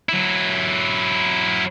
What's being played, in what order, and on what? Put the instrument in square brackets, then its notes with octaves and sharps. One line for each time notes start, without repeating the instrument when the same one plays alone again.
[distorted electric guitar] F#3 E4